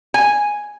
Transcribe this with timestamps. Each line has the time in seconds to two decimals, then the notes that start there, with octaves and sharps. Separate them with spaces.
0.14 G#5